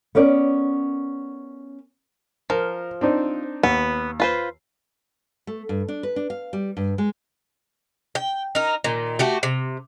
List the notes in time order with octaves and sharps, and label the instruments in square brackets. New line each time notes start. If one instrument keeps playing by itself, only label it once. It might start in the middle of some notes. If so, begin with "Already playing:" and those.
[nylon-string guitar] B3 C#4 A#4 D5
[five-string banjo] F3 [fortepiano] A#4
[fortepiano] C4 D4 D#4
[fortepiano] D#2 [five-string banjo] B3
[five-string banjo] F4 B4 C5
[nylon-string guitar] A3
G2
D4
B4
D4
F5
G3
G2
G#3
[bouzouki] G5
D#4 A#4
A#2 D#3
A3 F#4 G4
C3